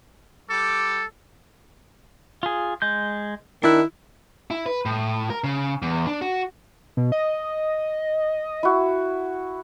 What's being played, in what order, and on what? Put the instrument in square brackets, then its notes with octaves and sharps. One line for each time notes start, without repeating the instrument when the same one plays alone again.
[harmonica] G3 D6 [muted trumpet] A4
[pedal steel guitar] F4 G#4
G#3 G6
[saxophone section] D#3 E4 [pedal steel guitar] D4 F#6
[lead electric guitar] E4
B4
A2
A#4
C#3
E2
D4
F#4
[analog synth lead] B2
D#5
[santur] E4 F#4